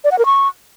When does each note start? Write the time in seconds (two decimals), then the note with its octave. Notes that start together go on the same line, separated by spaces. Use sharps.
0.04 D5
0.12 F#5
0.19 A#4
0.26 C#6